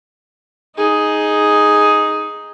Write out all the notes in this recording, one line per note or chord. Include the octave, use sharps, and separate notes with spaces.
D#4 G#4